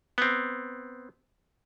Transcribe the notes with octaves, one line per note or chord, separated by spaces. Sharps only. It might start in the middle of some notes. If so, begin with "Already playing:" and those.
B3 C4